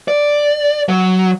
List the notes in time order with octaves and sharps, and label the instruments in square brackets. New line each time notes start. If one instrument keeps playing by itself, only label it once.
[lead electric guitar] D5
F#3